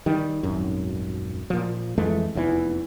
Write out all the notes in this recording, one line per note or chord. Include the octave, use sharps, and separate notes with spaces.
D#3 G3
D#1 G#1 F#2
A#2 F3
F2 E3 G#3 A3
F1 E2 B2 E3